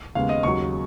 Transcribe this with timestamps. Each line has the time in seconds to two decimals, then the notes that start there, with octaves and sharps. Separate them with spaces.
0.15 D#2 C#3 G#3 B3 F5
0.29 D#5
0.43 D#2 C#3 F#3 C#6